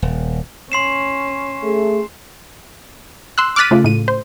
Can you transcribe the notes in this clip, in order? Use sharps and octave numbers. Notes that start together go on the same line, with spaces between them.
D#1
C#4 C6 C7 E7
A3 G#4
C6 E6 F#6
D6 F6 F#6 A6 B6 D#7
C#3 A3 F4
A2 D#7
C5